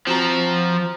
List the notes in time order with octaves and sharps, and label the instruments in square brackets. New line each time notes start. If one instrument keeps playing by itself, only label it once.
[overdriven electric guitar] F3 [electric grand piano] C4 F#4 A#5